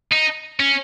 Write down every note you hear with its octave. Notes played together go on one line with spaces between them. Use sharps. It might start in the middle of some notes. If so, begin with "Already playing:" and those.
D#4
C#4